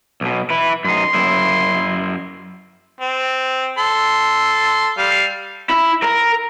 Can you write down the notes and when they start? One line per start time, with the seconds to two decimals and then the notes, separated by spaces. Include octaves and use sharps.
0.21 B1 B2
0.50 E4 B4
0.84 F#2 D#4 C6
1.14 F#2 E4
3.01 C4
3.78 A4 C6
4.98 G3 F5
5.69 E4
6.02 A#4